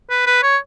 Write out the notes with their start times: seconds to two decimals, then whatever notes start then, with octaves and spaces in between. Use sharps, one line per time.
0.10 B4
0.26 B4
0.43 C#5